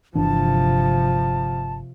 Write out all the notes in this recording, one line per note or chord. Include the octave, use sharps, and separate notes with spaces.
G1 C3 E3 F3 D4 A5